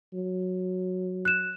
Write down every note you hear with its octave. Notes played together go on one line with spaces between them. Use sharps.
F#3
F#6 E7